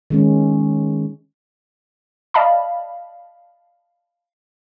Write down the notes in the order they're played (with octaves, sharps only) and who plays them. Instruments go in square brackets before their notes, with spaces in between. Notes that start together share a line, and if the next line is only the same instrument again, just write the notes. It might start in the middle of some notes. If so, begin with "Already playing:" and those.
[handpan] D#3 G#3 C#4
[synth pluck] D5 D#5 F5 A5 B5